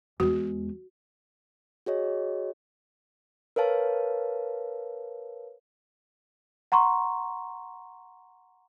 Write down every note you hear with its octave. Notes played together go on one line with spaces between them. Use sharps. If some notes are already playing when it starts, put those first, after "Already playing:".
E2 G#3 F#4
F#4 G#4 C#5 D#5
A#4 B4 C#5 F5 A5
F#5 A#5 C6 C#6